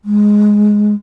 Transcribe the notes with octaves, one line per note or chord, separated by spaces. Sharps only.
G#3